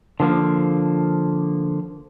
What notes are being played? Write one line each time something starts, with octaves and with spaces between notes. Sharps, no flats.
D3 F3 A#3